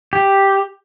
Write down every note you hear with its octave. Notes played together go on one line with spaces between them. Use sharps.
G4